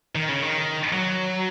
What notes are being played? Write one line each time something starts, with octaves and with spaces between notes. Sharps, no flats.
D#3
C#3
D#3
F#3